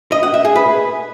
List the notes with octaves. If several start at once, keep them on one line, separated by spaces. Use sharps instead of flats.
D#5
F#5
E5
G#4
B4